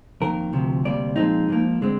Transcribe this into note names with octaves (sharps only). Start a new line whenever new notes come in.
F2 D#3 A#3 A#4
D2 C3 F3
D2 C3 G3 A#3 D5
A#2 F3 G#3 C4 D#4
G#2 F3 A#3
D3 G#3 C4